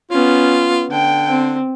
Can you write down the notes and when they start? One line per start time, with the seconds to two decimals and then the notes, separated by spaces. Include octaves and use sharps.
0.11 B3 C#4 F4
0.91 D3 G5
1.29 C4